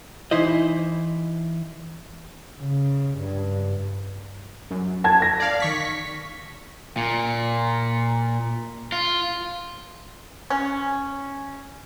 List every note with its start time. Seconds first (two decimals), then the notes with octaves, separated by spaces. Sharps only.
0.31 E3 D#4 E4 C5 D#5
2.60 C#3
3.18 G2
4.71 F#2
5.04 A5 G#6
5.22 A#6
5.39 D5 F5
5.60 D#3 C#6 B6
6.97 A#2
8.92 F4
10.50 C#4